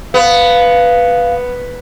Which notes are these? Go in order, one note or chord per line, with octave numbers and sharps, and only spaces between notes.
B3 F5